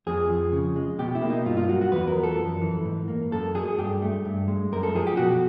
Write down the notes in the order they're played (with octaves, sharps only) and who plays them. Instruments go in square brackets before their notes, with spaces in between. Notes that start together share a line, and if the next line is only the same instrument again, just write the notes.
[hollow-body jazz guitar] F2 G#4
F3
C#3
G#3
B2 G4
E4
A#3
D#4
G2 F4
F4
F#3 F#4
F#4
E2 B4
A#4
F3
A4
F#2
E3
G#2
A#3
F#2 A4
F#3 G#4
G2 G4
A3
G2
G#3
F#2 A#4
A4
F3 G#4
G4
B2 F#4